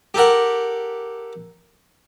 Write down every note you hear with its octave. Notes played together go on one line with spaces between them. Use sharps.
G4 A4 A#4 F#5